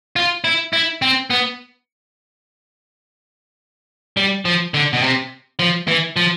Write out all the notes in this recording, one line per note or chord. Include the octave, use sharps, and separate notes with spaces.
F4
E4
E4
C4
B3
G3
F3
D3
B2
C3
F3
E3
F3